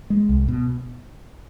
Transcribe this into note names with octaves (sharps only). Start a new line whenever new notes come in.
G#3
C2
B2